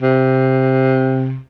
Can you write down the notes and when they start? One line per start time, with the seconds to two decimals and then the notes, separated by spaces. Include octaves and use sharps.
0.02 C3